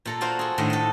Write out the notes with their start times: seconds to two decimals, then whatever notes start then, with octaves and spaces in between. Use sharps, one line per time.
0.05 A#2 A4 A#5
0.21 F4 F#4 C5 D5 F5
0.39 G#4 A4
0.58 A2 D#3 D4 D5 D#5 F#5
0.70 A4 D#5